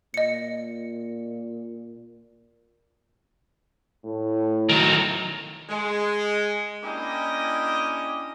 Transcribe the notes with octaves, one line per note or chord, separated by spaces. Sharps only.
A#2 D#5 C#7
A2
D#3 F#3
G#3
A#3 C#4 D4 E4 G4 D#5